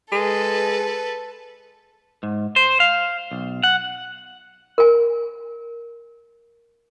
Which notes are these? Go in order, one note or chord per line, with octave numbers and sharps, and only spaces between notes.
G#3 A4 B4
G#2
C5
F5
B1
F#5
A#4 G#5